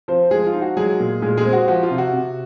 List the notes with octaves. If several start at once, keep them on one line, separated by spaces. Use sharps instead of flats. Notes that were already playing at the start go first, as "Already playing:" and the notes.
F3 C4 C5
F3 G#3 G#4
F4
D#4
F#4
F#3 G#3 G#4
A#2
A#2 G#3 G#4
G#3 G#4
C4
F#4
F3 F#4
F4
C3
F#4
C3